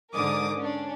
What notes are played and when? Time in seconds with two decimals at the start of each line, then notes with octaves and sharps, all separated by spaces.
0.13 G#2 D3 A#4 D6 D#6
0.57 C#4 D4